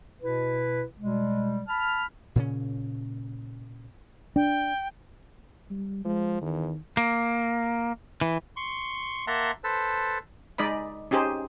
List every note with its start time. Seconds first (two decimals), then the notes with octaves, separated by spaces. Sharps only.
0.22 B2 E4 B4
0.99 B2 G3 G#3
1.68 A5 B5 F6
2.36 A#2 C#3 C#4
4.36 D4 G5
5.70 G3
6.05 F3 G#3
6.41 E2 D#3
6.97 A#3
8.21 E3
8.57 C6 C#6
9.27 A#3 E5 F#5 A5 A#5 C6
9.64 A4 B4 C5 A5
10.58 G#3 D#4 D5 D#5 B5
11.11 C#4 D#4 G4 G#4 C5